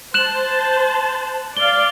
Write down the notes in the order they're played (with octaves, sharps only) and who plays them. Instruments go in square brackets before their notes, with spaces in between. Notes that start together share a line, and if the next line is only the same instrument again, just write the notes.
[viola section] C5 A5 [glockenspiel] F#6 E7 F#7
[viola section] D5 F5 [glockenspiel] G7